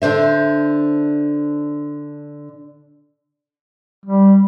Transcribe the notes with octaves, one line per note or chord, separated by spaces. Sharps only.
D3 D4 C5 E5
G3